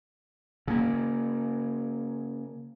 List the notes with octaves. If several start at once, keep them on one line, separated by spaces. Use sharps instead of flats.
C#3 A#3